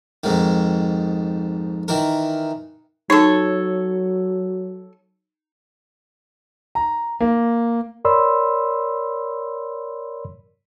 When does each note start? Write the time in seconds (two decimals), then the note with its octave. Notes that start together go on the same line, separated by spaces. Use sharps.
0.24 F2 G#2 D#3
1.88 D#3 E3 A#4
3.10 F#3 D#4 A4 C#5
6.75 A#5
7.20 A#3
8.05 A#4 C#5 D5 B5 C6 E6